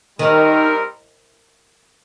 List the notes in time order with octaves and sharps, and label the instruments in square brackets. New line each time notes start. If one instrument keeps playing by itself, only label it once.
[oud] D#3 [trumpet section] G3 C4 D#4 A#4